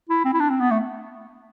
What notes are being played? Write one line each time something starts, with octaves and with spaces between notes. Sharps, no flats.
E4
C4
E4
D4
C4
B3
A3